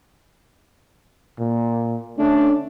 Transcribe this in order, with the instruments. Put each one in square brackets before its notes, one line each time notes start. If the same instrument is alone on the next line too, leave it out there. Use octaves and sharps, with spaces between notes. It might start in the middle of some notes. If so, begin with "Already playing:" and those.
[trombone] A#2
[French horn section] D3 C#4 D4 [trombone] A3